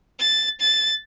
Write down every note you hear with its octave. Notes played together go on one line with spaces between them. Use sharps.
A6
A6